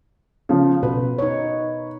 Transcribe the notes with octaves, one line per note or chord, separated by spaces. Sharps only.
C#3 F3
B2 B4
D#4 C#5